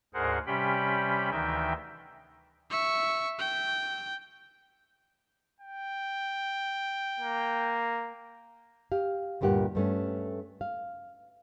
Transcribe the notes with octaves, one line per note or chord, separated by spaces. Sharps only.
D2 G#2 G#4 A#4 C5 F#5
C3 G3 C#4 G4 G5 B5
D2 D#3 E3 D#4 E5 G5
E5 C#6
G5
G5
A#3
G4 F5
D2 G2 A#2 G4 A#4 F#5
G2 A3 C#4
F5